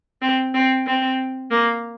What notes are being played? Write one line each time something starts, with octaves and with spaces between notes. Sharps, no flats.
C4
C4
C4
A#3